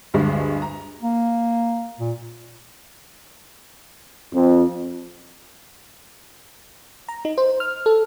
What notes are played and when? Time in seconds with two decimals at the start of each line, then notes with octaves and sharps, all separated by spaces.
0.14 D2 G2 G#3
0.62 A#5
1.02 A#3
2.00 A#2
4.34 F2
7.09 A#5
7.25 D#4
7.38 C5
7.60 F6
7.86 A4